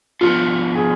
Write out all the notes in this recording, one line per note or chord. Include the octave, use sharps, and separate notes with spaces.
F3 B3 D4 F4
G#4